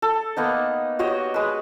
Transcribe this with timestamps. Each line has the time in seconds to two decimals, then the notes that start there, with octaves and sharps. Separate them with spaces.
0.02 A4
0.37 A#3 B3 D#4
0.99 F#4 G4 C#5 D#5
1.34 G#3 B4